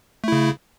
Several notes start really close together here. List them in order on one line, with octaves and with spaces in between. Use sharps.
A3 E4 C#3